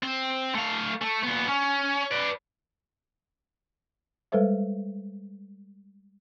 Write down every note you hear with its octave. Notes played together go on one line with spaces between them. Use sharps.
C4
A3 F5
A3
A#2 B3
C#4
B4 D5
G3 G#3 A4 B4 C5 E5